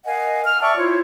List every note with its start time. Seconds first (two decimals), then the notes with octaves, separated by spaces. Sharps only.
0.06 A#4 D#5 F5 F#5 G#5
0.46 F6
0.61 D5 E5 G5 A5 C#6 E6
0.77 E4 F4 C5 C#5